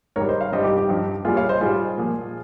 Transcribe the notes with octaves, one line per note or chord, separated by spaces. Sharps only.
G#2 D#3 G3 A#4 C#5
C5 D#5
C#5 F5
G2 G3 C5 D#5
D#4 G4
D#4 G4
G2 F3
A#2 G3 F4 G#4
C#5 F5
C5 D#5
G#2 G3 F4 G#4
A#2 F3